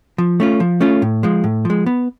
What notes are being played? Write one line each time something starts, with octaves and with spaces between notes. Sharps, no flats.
F3
A3 C#4 F4
F3
A3 C#4 F4
A2
F3 G#3
A2
F3 G#3
B3